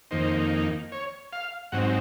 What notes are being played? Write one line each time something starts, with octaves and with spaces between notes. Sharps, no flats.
F2 D#3 A#3 D#4 C5
C#5
F5
G#2 F#3 C4 D#4 F#5